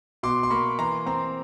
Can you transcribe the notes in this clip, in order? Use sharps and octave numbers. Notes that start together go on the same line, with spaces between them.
B2 C6 D6
C6
A#3 B5 C#6
E3 A#5 C6
C4 A#5 C6